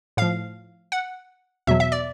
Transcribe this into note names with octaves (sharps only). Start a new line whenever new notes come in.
A2 F3 F5
F#5
E2 B2 F#3 E5
E5
D5